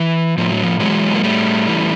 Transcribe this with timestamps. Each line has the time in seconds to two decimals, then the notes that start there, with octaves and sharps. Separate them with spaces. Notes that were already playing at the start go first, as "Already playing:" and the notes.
Already playing: E3
0.37 A2 F3
0.50 F#3
0.63 F3
0.80 E3 F#3 G#3
1.15 A#3
1.23 A2 G3 A3
1.68 E3